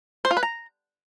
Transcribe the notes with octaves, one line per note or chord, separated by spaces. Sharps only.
C5
F4
B4
A#5